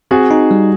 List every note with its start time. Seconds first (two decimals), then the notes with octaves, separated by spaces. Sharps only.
0.11 C4 F#4 G#4
0.31 D#4
0.51 G3